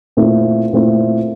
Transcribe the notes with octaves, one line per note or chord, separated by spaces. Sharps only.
A#2 A3 C4 E4
A#2 A3 C4 E4